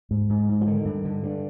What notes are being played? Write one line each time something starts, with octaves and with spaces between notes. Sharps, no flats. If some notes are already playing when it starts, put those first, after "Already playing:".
G#2
G#2
G#2
F3
D3 D#3
G2
D3
G2